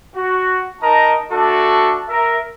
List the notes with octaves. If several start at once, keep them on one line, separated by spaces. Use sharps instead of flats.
F#4
D#4 A#4 D#5 A5 A#5
A3 D4 F#4 A4
A#4 E5